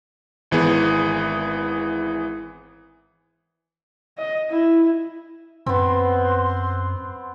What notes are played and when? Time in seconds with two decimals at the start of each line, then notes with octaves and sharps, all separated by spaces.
0.51 G#1 E3 B3 G#4
4.18 D#5
4.50 E4
5.66 F#2 B3 C4 C6